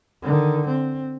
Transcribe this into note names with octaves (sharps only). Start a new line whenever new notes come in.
D3 D#3
C4